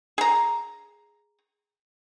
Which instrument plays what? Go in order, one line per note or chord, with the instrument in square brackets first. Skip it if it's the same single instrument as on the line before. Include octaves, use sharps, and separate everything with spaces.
[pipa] G#4 A#5